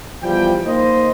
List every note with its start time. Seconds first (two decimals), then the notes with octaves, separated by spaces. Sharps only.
0.23 E2 F3 G3 G5
0.66 A#3 D#4 C5 D#5